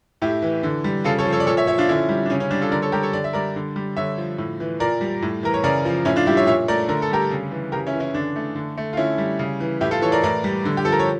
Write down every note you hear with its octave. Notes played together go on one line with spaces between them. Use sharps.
A2 E4 G4
E3
D3
G3
C#3 F4 A4
A4 C#5
F3
A4 C#5
D5
A#2 A4 C#5
C#5 E5
F3 C#5 E5
D4 F4
D3 C#4 E4
G3
D4
C#3 C#4
C#4
G3 D4
F4 A4
D3 A#4 D5
A4 C#5
G3 G4 A#4
A4 C#5
D3 D5
E5
G3 A#4 D5
D3
G3
D3 C#5 E5
F3
A2
E3
A#2 A#4 D5
G3
A2
E3 A#4
C#5
C#3 A#4 D5
F3
A2 C#4 E4
D4 F4
G3 E4 G4
C#5 E5
A#2 C#5 E5
A3 A#4 D5
D3 A#4
A4
G3 G4 A#4
C#3
E3
C#3 G4 A#4
C#4 E4
E3
C#4 E4
D3 D4
A3
D3
A3
F4
D3 C#4 E4
G3
C#3
E3
A2 E4 G4
F4 A4
E3 A4 C#5
A#4 D5
A2 A#4 D5
G3
D3
G4
F3 A4
A#4
C#5